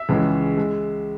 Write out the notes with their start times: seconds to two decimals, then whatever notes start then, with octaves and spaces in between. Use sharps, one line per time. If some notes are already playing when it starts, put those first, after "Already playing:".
Already playing: E5
0.09 C#2 C#3 E3 G#3 C#4
0.57 G#3